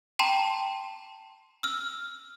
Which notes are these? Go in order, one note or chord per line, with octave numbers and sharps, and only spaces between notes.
G5 A5 A#5 C6 E7
E6 F6